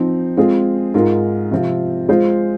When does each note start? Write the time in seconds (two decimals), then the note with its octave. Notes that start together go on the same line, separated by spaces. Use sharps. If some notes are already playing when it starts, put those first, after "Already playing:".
Already playing: F3 C4 D#4
0.37 G#3 C4 F4 G#4
0.94 G#2 G#3 F4 A#4
1.51 C3 F3 C4 F4
2.09 G#3 F4 G#4 C5